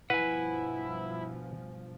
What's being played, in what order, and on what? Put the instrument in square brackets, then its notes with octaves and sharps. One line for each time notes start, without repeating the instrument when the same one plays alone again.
[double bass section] G2 B2 F3 [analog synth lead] E4 [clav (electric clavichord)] B4 [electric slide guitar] F#5 G#5